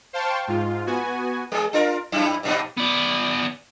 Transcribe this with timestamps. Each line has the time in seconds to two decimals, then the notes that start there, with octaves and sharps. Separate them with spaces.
0.13 C5 F5 G5 A5 C6 C#6
0.48 G#2 F4
0.87 B3 F#4 G#5
1.52 G#3 G#4
1.73 D4 F4 A#4
2.12 F#2 G3 E4
2.43 G2 A#2 D#4
2.77 B3 D5